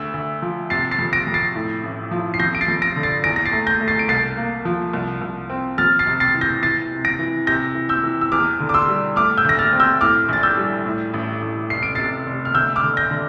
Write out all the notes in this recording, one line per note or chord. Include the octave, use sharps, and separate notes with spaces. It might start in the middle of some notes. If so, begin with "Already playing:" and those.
Already playing: D2 E6
D2
F3
C3 A6 C7
A6 C7
F2
A#6 D7
F2
A6 C7
A2
A1
F3
C7
F2 G6 A#6
D7
A6 C7
F2
A#6 D7
D3
A6 C7
E2 A#6 D7
A#6
A6 C7
A3
G6 A#6
A3
A6 C7
D7
C2 A6 C7
A#3
F3
C2
C2
C4
F2 F6 A6
A6 C7
C3
A6 C7
E3
G6 A#6
E3 A6 C7
C3
A#6 D7
E3
C3 G6 A#6
E3
E6 G6
E3
E6
E2 D6 F6
D3
D6
C6 E6
G3
A3 D6 F6
E6 G6
D2 A#6
F6 A6
C4
E6 G6
A2 D6 F6
A#1 A6
E6 G6
G3
A2
A1
A1
F1 C7
D7
C3 A6 C7
F1
F6
D2 E6 G6
D6 F6
D3
G6 A#6
D3